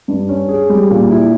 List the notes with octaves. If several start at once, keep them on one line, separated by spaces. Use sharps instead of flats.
G2
C#4
G#4
G3
A#2
E4